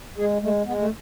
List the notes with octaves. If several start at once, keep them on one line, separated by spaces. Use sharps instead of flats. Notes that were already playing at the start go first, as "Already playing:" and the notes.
G#3 G#4
G#3 A3
G#3 B3
A3